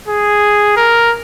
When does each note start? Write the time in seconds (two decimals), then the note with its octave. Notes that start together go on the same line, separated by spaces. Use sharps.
0.08 G#4
0.77 A#4